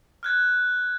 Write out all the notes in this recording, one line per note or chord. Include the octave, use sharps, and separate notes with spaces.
F6 F#6 G#6